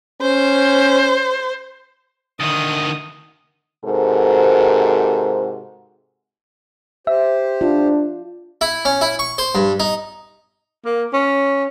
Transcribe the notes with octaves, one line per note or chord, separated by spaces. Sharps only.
C#4 C5
D2 D#3 D#6
G#2 C3 F#4 A4 A#4 C5
G4 C5 E5
D4 F4
E4
C#4
E4
C#6
C5
G2
D#4
A#3
C#4